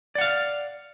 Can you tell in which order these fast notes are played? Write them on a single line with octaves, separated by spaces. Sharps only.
D5 F#5 F5